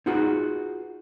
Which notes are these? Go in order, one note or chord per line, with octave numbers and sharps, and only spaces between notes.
D#4 F4 F#4 G#4 B4